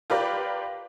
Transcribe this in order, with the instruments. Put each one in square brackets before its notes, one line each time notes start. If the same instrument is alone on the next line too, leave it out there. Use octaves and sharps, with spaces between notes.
[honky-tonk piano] F4 G4 A#4 B4 D5